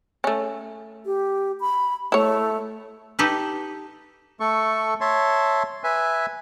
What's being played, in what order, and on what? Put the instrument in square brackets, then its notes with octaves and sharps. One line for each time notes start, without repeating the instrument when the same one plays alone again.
[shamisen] A3 C#4
[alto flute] G4
B5
[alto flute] A3 [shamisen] E4 C#5
[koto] D#4 G4 A4 B4
[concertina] A3 A4 C#6
C#5 E5 A5 C6
B4 E5 G#5